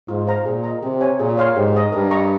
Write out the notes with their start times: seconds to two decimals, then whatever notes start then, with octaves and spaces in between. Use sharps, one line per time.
0.08 G#2 F4
0.27 C5 F5 A#5
0.45 A#2 G#4
0.64 D#5 A#5
0.82 C3 G4
1.01 C#5 G#5
1.19 A#2 G#4
1.37 C#5 F5 C6
1.56 G#2 G4
1.74 A#4 D#5
1.92 G2 A#4
2.11 D#5 A#5 C#6